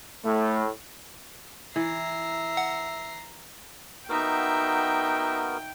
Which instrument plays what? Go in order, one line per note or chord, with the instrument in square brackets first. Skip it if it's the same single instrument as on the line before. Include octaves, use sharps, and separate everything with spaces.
[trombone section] A2 [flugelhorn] A3
[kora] E3 [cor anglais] E5 [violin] A#5 C7
[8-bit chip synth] F#5
[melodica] B3 F#4 A#4 [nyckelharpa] D#4 E5 [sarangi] G5